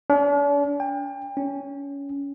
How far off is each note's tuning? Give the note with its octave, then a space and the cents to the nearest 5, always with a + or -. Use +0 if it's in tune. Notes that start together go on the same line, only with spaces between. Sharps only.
D4 -45
G5 +35
C#4 +20